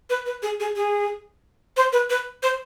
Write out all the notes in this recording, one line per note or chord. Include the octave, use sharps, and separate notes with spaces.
B4
B4
G#4
G#4
G#4
C5
B4
B4
C5